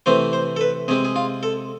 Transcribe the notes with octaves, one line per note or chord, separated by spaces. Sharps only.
C3 E3 A3 C4 C5
C5
A4
B4
C3 G#3 C4 G#4
G#4
F4
A4